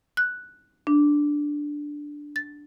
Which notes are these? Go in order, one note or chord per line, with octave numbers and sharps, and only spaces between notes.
F#6
D4
A6